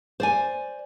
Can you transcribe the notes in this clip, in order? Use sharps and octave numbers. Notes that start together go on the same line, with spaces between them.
C5 D5 G#5